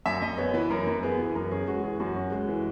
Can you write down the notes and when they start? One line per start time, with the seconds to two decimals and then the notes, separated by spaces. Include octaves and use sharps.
0.06 F#2 E5
0.22 F#2 D#5
0.38 B3 C#5
0.54 E3 B4
0.70 F#2 A#4
0.87 F#2
1.03 B3 G#4
1.19 E3
1.35 F#2 A#4
1.51 C#4 G#4
1.67 G#3 F#4
1.83 E3 G#4
2.00 F#2 F#4
2.16 C#4
2.32 G#3
2.49 E3